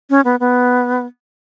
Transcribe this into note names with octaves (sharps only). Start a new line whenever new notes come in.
C#4
B3
B3